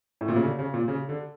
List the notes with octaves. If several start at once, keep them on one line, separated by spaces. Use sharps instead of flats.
A2
A#2
C#3
D3
C#3
A#2
C#3
D3